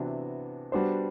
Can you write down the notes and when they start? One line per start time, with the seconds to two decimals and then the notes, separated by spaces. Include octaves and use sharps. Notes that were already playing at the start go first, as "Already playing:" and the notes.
Already playing: C3 E3 B3 D4 F#4
0.72 G3 B3 D4 F#4 C5